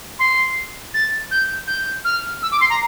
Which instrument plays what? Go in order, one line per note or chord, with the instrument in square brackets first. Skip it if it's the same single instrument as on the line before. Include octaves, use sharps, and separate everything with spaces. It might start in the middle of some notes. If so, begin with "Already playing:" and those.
[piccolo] C6
A6
G6
G6
F6
E6
D6
C6
A#5